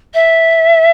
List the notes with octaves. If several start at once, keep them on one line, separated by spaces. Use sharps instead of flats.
E5